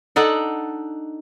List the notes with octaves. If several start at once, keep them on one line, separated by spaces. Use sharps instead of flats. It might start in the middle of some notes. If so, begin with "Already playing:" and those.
D4 D#4 A4 F#5